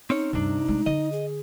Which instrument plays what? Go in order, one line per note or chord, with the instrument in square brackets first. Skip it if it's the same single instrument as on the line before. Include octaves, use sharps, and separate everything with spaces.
[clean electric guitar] C4 C#4 C#5 [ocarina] D#4
[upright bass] D2 G2 [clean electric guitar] C3 D4
[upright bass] G#3 A3
[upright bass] D3 [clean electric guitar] D#5
[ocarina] G#4